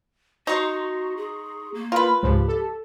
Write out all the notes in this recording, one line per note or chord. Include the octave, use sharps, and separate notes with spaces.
D#4 F#4 A#5 C6 C#6
G#4
A#3
F4 A#4 B4
C#2 G#2 F3 G4
A4